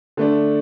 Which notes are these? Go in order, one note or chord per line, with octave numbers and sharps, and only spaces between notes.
D3 A3 D4